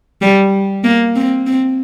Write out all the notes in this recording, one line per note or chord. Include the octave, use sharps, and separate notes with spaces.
G3
A#3
C4
C4